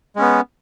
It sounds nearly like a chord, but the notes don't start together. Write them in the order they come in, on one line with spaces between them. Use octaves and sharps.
G#3 C#4 B3